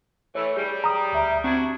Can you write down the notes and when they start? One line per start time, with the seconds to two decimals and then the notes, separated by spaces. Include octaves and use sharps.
0.35 E3 A3 C#5
0.57 G3 G#4
0.84 A#5 D#6
1.13 D2 E5 A#5
1.44 C4 D4 E4 F#4 G#6